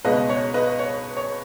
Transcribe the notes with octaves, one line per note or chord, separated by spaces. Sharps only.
C#2 B2 G#3 B4 D#5
C#5
B4 D#5
C#5
C#5